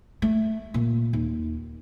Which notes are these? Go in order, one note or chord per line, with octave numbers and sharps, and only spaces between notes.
A3
A#2
D#2